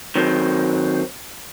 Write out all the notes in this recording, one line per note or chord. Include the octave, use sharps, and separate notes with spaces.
D#3 F#3 C4